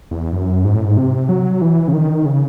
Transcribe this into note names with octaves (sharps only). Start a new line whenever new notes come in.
E2
F#2
G#2
A2
G#2
C3
F#3
E3
C#3
D#3
C#3